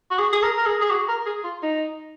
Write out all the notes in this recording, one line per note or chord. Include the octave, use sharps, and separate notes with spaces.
F#4
G#4
G#4
A#4
A#4
G#4
G#4
F#4
A#4
G#4
F4
D#4